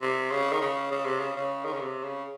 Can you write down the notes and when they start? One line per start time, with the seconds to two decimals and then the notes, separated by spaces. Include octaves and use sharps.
0.02 C3
0.31 C#3
0.53 D#3
0.61 C#3
0.91 C#3
1.06 C3
1.20 C#3
1.37 C#3
1.65 D#3
1.73 C#3
1.81 C3
2.04 C#3